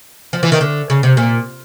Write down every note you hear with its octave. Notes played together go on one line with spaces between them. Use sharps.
F3
E3
D#3
D3
C#3
C3
A#2